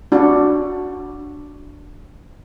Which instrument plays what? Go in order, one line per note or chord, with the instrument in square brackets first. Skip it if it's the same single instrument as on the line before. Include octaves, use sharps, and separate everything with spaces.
[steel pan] D4 F#4